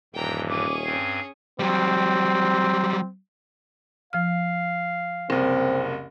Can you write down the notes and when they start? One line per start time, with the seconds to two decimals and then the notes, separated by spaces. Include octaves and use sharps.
0.14 D#1 G2 E3 G5 A#5
0.50 C#4 G#4 D6
0.85 G2 C4 G#6 C7
1.59 F#3 G3 C4
4.13 F3 F5 F6
5.30 F#1 C2 C4